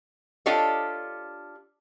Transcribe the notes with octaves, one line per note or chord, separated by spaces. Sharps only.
D4 F4 G4 A4 C#5 D#5